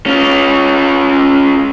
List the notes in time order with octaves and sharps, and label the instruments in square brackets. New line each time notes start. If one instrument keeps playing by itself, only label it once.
[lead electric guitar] C#4 F4